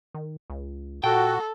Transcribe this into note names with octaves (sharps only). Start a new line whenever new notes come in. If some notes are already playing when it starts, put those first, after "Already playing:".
D#3
C#2
A#2 F#4 A4 G5